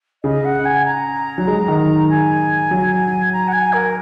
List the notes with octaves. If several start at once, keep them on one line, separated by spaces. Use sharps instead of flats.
C#3 D#5
F#5
G#5
A#5
F#3
G#3
D#3
G#5
F#3
A#5
F#5
G#5
A#4